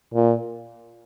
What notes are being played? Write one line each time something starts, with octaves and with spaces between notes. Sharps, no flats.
A#2